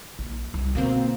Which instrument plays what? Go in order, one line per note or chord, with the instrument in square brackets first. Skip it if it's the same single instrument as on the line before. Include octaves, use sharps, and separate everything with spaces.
[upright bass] A#1
C2
[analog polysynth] B2 A#3 C4 [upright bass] D3